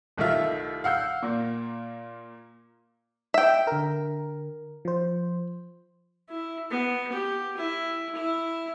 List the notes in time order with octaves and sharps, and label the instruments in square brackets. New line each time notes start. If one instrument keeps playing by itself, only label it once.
[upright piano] C2 D#3 A3 F4 E5 F6
F5 F#5 E6 G6
A#2 A#3
[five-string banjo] E5 G5
[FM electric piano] D3 A#4
F3 C5
[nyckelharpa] E4
B3
G4
E4
E4